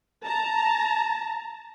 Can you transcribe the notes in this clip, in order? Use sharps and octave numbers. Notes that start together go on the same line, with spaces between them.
A5 A#5